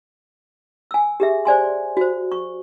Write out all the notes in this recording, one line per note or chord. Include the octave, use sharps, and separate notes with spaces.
G#5 E6
G4 G#4 E5
C5 D5 G#5 C6
F#4 C5
C#6